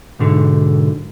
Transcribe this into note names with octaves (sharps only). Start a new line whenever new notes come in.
B1 G#2 D3